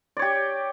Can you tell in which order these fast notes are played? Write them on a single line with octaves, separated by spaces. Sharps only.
D5 C#5 G4